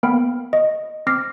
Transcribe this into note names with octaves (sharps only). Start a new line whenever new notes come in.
A#3 B3 A#4 G5 B5
D#5
C4 D6 F6 A#6 C7